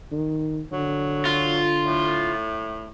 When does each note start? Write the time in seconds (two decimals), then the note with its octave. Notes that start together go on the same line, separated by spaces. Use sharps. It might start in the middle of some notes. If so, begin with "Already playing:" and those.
0.12 D#3
0.72 D3 F#3
1.25 F4
1.84 A2